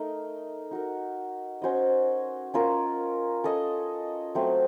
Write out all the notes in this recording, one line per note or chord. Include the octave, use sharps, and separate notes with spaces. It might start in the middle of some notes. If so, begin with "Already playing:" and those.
Already playing: A3 D#4 A#4 D#5
D#4 F#4 A#4
C#4 F#4 C5 D#5
C#4 F4 A#4
C#4 A4 D#5
F#3 A3 C4